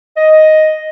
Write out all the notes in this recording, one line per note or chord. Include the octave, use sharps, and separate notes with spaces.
D#5